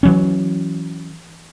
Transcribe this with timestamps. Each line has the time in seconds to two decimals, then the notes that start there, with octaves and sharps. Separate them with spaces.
0.03 E3 F#3 C#4